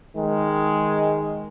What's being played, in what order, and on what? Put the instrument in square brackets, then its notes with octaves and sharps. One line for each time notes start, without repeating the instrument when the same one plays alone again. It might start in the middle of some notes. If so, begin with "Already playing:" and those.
[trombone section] D#3 G#3